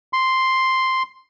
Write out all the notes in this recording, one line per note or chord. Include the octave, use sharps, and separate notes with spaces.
C6